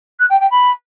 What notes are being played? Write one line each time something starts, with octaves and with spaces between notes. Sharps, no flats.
F#6
G5
G5
B5